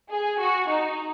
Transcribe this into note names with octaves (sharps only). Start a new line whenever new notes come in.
G#4
F#4
D#4